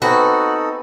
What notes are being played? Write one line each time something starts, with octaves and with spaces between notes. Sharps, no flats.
B3 C4 D#4 F#4 A4 G#5